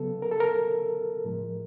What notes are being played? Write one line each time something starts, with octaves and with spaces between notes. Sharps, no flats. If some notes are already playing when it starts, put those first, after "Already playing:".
Already playing: C#3 F#3 B3 A4
A#4
A4
A#4
A2 F3 G#3